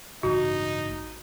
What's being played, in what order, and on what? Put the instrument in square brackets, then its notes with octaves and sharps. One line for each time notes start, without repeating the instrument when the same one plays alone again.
[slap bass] A1 G2 C#3 [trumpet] D#4 [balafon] F#4